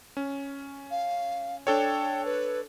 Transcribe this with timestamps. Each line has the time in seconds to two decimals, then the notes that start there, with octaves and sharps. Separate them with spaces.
0.17 C#4
0.91 F5
1.67 D4 A4 C#5 G5
2.25 B4